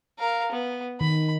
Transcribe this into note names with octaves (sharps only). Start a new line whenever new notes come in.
A#4 F5
B3
D#3 B5